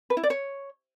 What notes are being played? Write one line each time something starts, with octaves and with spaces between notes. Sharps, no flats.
B4
E4
D5
C#5